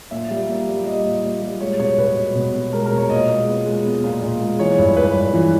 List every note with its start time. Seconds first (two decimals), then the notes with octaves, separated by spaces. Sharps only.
0.11 A#2 E5
0.31 G3
0.49 A#3
0.68 G3
0.86 G3 D#5
1.05 A#2
1.23 A#2
1.42 G3
1.60 G#3 C#5
1.79 B2 C#5
1.98 B2 B4
2.17 B2
2.35 B2
2.54 B2
2.73 G#3 A#4
2.86 A#4
2.92 B2
2.98 C#5
3.10 A#2 D#5
3.29 G#3
3.48 B3
3.66 G#3
3.85 B3
4.04 A#2
4.22 A#2
4.40 G#3
4.59 E3 C#5
4.78 G2
4.96 G2 B4
5.15 G2
5.34 E3